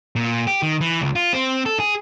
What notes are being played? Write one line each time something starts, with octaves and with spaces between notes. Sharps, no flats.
A#2
G4
D#3
E3
C#2
F4
C4
A4
G#4